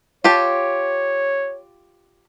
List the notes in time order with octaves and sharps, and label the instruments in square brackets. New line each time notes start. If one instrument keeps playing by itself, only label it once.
[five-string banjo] F4 G4 A5 [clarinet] C#5